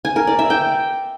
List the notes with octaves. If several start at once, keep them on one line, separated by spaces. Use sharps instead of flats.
G#5
A#4
D5
E5
G5